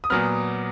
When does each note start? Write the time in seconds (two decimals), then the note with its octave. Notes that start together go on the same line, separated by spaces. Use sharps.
0.04 D#6
0.10 A#2 F#3 B3 F6